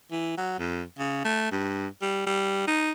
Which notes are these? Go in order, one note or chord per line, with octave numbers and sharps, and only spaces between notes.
E3
F#3
F2
C#3
A3
G2
G3
G3
D#4